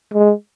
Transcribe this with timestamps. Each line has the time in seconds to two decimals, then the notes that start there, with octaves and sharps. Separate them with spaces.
0.14 G#3